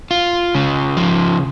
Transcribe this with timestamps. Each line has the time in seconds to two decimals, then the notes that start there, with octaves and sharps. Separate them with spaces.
0.11 F4
0.55 C#3
0.97 F3